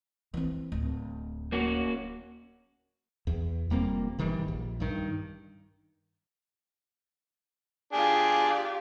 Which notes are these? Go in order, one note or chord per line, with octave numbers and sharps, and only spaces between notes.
E3 C4
D1
A#3 C#4 F#4
E2
F1 G3 A#3 C4
G1 D#3 E3 G3
A#1
G2 D#3
D4 F4 G4 G#4